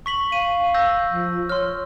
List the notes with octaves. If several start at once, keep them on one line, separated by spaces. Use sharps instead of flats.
C#6 B6 F#7
F5 D#7
E6 G6 A#6
F3
C#5 C6 F6